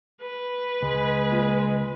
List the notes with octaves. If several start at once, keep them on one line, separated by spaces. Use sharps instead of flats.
B4
C#2 G#3
A#2